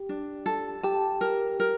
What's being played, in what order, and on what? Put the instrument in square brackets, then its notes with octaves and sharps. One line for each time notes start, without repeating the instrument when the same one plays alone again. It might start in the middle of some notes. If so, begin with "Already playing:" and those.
Already playing: [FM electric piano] G4
[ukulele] D4
A4
[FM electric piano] G4 [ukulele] A5
[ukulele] A#4
A#4